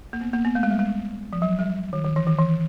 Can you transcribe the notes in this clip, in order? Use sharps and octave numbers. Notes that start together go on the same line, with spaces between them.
A#3
B3
A#3
B3
A3
G#3
G3
G#3
F3
F#3
G3
D#3
D#3
E3
D#3
E3